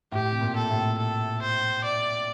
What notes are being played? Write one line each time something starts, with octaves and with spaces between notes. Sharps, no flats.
A2 G4
C3
A#2
A4
A2 C3
A4
C5
D5